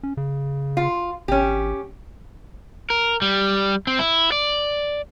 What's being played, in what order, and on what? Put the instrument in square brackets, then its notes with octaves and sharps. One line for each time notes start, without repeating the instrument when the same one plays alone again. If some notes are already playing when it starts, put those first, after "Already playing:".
[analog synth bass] C#4
C#3
[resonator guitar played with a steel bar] F4
[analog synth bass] G#1 [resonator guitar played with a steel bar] C#4 G4
[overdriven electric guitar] A#4
G3
C4
E4
D5